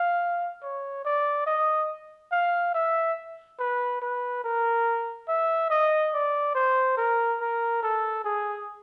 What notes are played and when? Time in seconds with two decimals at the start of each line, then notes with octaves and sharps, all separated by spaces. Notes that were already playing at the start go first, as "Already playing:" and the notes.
Already playing: F5
0.63 C#5
1.05 D5
1.46 D#5
2.32 F5
2.74 E5
3.59 B4
4.02 B4
4.44 A#4
5.28 E5
5.70 D#5
6.13 D5
6.55 C5
6.97 A#4
7.40 A#4
7.83 A4
8.25 G#4